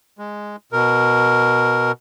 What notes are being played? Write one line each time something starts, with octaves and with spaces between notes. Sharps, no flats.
G#3
B2 A#4